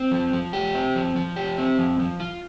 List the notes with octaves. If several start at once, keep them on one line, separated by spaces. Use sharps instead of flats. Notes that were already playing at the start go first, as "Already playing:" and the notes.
Already playing: C4
F3
F3
G4
C4
F3
F3
G4
C4
F3
F3
F4